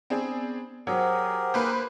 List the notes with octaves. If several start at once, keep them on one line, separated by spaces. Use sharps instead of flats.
B3 C4 D4 G#4
F#3 G4 G#4 A#4 C5 F#5
A#3 B4 C5